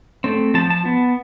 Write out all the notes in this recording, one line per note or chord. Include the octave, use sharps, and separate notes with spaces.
A3 C4
F3 A5
A5
B3